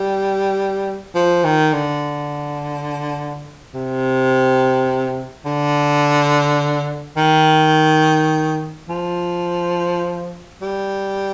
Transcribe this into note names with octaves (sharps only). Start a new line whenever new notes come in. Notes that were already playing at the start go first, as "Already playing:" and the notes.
Already playing: G3
F3
D#3
D3
C3
D3
D#3
F3
G3